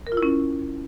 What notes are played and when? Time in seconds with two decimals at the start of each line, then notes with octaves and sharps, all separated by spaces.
0.07 A#4
0.12 F4
0.17 E4
0.23 C#4